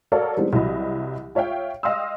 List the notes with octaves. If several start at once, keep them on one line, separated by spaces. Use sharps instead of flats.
F#4 A4 A#4 C#5 D5 F5
E3 G3 G#3 B3 C4 D#4
C2 E3 F#3 D#5 B5
F4 C#5 E5 F5 G5
D#5 F5 G5 C6 D#6 E6